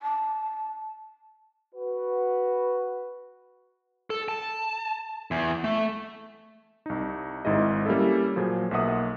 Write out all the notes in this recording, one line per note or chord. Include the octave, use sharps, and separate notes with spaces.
A5
F#4 B4
A4
A5
E2
A3
C2 D#4
G#1 G#2 E4 G#4 D#5
G3 A#3 C#4 E4 A4
A#2 F3 F#3 G#4
B1 A#3 E5 F#5 D#6